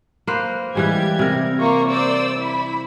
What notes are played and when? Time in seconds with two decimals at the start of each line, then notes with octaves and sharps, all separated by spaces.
0.27 A#3 B4 C5
0.75 E3 G3 G#3 G4 G#6
1.19 C3 A#4
1.60 A#3 F4 C#6
1.88 C5 D5 E6
2.38 E4 B5